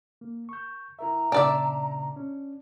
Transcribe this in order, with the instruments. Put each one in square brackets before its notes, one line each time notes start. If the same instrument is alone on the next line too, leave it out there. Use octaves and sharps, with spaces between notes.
[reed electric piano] A#3
C#6 G6
[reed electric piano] E4 A#4 E5 [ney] A#5
[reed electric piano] A#2 C#3 [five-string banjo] D4 D5 E5
[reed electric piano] C#4